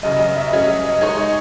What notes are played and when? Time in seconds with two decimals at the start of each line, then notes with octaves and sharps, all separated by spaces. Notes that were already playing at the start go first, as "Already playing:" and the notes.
0.03 F#2 C#3 F#3 D#5
0.19 D#5
0.36 E5
0.52 F#3 C#4 G#4 D#5
0.68 D#5
0.85 D#5
1.01 G#3 D#4 G#4 C#5 D#5
1.17 D#5